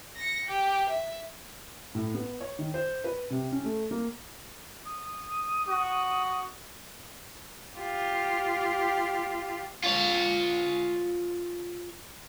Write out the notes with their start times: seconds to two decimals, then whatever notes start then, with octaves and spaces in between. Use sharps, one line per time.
0.16 A#6 C#7
0.47 G4
0.89 E5
1.95 A2
2.14 B3
2.40 C#5
2.59 D#3
2.74 C5
3.04 B4
3.30 C3
3.52 C#4
3.64 A3
3.91 A#3
4.86 D#6
5.69 F#4
7.77 F4 G4
9.84 F4 C#5